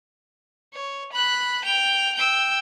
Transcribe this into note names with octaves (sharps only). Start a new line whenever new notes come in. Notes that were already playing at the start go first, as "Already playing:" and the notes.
C#5
B5 F#6
G5 F7
G5 E6